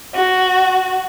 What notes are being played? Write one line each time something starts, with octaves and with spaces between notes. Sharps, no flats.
F#4